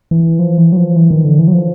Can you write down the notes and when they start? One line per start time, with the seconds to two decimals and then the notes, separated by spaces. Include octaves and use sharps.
0.11 E3
0.39 F3
0.58 E3
0.72 F#3
0.77 F3
0.96 E3
1.11 D#3
1.25 D3
1.39 E3
1.48 F#3
1.53 F3